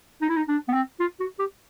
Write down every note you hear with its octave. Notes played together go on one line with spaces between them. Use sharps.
D#4
E4
D#4
D4
B3
C4
F4
F#4
G4